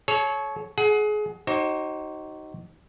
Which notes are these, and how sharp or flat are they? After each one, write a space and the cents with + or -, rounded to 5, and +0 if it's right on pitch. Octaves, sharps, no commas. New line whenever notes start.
A4 -40 C#5 +0
G#4 +30 F#5 +5
D#4 +0 F#4 +40 C5 +40